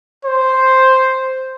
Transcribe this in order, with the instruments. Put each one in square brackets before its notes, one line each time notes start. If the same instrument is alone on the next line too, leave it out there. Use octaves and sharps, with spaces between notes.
[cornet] C5